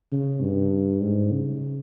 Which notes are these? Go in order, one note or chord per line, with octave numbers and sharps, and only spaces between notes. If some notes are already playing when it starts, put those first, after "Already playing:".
C#3
G2
G#2
C#3